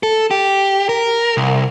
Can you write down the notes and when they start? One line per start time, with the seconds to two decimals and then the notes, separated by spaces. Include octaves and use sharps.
0.03 A4
0.31 G4
0.89 A#4
1.37 C2